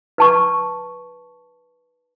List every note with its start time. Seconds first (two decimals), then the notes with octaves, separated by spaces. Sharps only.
0.18 B4 A5 C#6